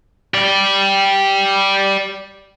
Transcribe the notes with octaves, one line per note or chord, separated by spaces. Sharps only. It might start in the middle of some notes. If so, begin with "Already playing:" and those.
G4 D5